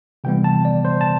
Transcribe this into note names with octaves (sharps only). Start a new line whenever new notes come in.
C3 E3 G3 B3 G5
A5
D5
C5
A5